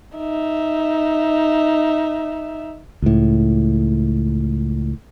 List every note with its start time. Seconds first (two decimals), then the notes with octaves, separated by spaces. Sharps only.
0.17 D#4 E5
3.02 C#2 A2